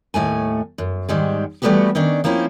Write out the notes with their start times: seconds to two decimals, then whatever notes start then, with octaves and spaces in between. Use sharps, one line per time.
0.14 D#2 A2 A3 G#5
0.78 F#2
1.09 G#2 D#3 G3 G#3
1.62 E3 G3 A3 B3 F#4 G4
1.95 D#3 C#4 D4 D5
2.24 F3 A#3 C4 C#4 E4